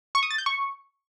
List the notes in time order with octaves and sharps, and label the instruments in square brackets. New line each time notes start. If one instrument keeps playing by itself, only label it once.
[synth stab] C#6
D#6
A6
G6
C#6